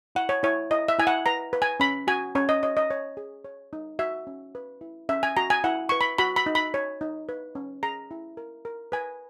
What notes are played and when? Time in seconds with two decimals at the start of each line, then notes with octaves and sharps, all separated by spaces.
0.15 E4 F#5
0.29 C#5
0.43 E4 C#5
0.71 E4 D#5
0.88 E5
0.99 E4 G#5
1.07 F#5
1.26 B4 A#5
1.53 B4
1.62 G#5
1.80 C#4 B5
2.07 F#4 G#5
2.35 C#4 C#5
2.49 D#5
2.63 C#5 D#5
2.77 D#5
2.91 C#5
3.17 G#4
3.45 C#5
3.73 D#4
3.99 F#4 E5
4.27 C#4
4.55 B4
4.81 E4
5.09 C#4 E5
5.23 G#5
5.37 F#4 A#5
5.50 G#5
5.64 E4 F#5
5.89 B4 C#6
6.01 B5
6.18 F#4 B5
6.36 B5
6.46 D#4
6.55 B5
6.74 C#5
7.01 D#4
7.29 B4
7.55 C#4
7.83 G#4 A#5
8.11 E4
8.37 A#4
8.65 A#4
8.92 B4 G#5